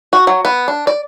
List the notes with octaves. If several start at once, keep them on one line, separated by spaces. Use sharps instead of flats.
F#4
F#3
B3
D4
D5